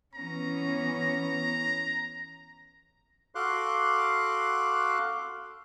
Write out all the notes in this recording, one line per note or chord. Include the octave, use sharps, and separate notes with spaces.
E3 B3 C#4 A#5
F#4 A4 F5 C6 D6 F#6